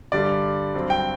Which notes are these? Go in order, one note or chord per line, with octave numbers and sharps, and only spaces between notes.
G2 D3 G3 D5
G2 F#3 C4
G5